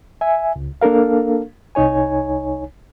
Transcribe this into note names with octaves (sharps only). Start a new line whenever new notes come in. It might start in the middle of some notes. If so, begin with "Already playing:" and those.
E5 G#5
C#2
A#3 D4 A4 A#4 F5
C2 D#4 C#5 G#5